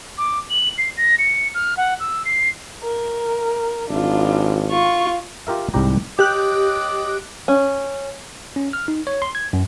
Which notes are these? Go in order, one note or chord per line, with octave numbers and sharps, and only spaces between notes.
D6
F#7
C7
A#6
C#7
F6
F#5
E6
C7
A#4
G#1 D4 F4
F4 C#6
F4 G4 A#4 E5
C2 G#2 G3 G4 A#5
G4 D#5 D6 F#6
C#4
C#4
F6
D#4
C#5
C6
G#6
F#2